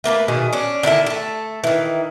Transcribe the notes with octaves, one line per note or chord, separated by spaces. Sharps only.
A3 A#3 A4 B4
B2 D#3 G#4
C#4 D4
D3 D#3 E4 A4
A3 A4
D#3 E3